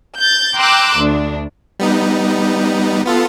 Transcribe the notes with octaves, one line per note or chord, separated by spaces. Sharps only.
G6 A6
G5 A#5 C6 D6 E6 F#6
D2 D4
G3 B3 D#4
B3 F4 A4